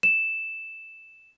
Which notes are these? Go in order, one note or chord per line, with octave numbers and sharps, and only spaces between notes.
E7